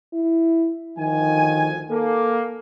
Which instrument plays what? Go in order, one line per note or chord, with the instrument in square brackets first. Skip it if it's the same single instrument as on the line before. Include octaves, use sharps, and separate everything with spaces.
[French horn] E4
[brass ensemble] D2 F3 G#5 [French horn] D#3
[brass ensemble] A#3 [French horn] A4